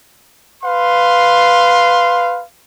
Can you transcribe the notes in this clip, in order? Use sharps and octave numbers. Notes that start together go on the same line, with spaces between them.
B4 F5 C6